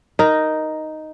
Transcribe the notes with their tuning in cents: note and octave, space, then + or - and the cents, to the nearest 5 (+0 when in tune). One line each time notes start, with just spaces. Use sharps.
D#4 +0 A#4 +0